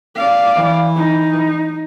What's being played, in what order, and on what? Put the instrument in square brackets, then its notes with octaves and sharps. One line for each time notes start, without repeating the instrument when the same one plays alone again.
[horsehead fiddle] D5 F5
[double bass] E3
[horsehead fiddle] D#4